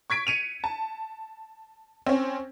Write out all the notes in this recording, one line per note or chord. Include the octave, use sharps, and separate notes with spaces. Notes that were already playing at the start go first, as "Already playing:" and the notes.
C#6 G#6 B6 D7
C#7 D#7 F7
A5
C4 C#4